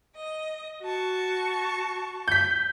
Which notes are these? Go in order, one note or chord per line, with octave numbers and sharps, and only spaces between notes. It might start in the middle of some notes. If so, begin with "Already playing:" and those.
D#5
F#4 A5 C#6
G6 B6